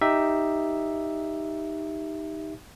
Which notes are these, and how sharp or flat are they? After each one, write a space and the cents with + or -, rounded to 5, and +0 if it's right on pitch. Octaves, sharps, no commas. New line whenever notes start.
D#4 +0 G4 +0 E5 +0